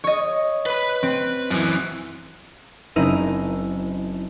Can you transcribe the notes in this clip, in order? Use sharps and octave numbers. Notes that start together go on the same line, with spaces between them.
C#5 D#5
B4 B5
C4
F#2 E3
F#1 C4 D#4 E4 A#4 D#7